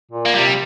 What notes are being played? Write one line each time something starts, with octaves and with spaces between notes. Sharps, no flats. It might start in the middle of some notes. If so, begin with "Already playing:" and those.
A#2
A#3
C3 G3